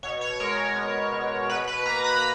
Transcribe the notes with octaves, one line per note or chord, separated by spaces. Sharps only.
B2 C#5
C#5
G#3 A#4
A#4
B3
B2
B2 B4
B4
A#3 A#5
B5